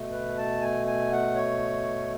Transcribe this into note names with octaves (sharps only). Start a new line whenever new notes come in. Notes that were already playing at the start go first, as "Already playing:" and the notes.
Already playing: B2 A3
B4
A5
G#5
G#5
F#5
C#5